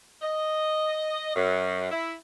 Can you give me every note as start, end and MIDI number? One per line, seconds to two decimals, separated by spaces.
0.22 1.33 75
1.35 1.90 42
1.91 2.13 64